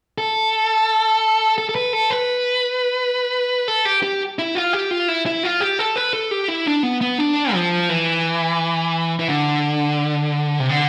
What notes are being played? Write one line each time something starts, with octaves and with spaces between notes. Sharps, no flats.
A4
A4
A4
B4
A4
B4
A4
G4
G4
E4
F4
G4
F4
E4
E4
F4
G4
A4
B4
A4
G4
E4
D4
B3
B3
D4
F3
E3
E3
D3
C3
D3